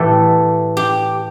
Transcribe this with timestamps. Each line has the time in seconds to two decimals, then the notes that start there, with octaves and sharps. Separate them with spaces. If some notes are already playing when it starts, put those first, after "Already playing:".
Already playing: A2 E3 A3 G4 A4
0.77 G4